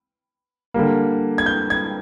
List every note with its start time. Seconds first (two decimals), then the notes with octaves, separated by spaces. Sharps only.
0.74 D3 G3 A#3
1.38 G#6
1.46 G6
1.70 G#6